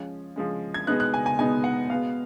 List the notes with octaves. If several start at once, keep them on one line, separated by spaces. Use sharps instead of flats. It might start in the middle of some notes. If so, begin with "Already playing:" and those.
Already playing: F3 G#3 C#4
F3 G#3 C#4
G#6
B2 G#3 B3 D#4 F#6
F#6
G#5
G#5
B2 G#3 B3 D#4 G#5
F#5
B2 G#3 B3 F5